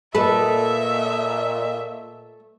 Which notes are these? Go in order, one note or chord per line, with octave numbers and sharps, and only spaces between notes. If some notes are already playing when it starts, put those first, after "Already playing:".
A#2 A3 A4 B4 D#5 E5